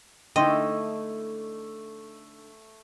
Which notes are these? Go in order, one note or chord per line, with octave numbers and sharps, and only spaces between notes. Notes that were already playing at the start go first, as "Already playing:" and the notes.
D3 A3 D#4 E4 D#5 G5 C6